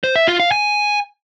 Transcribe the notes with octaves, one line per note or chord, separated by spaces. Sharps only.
C5
E5
F4
F5
G#5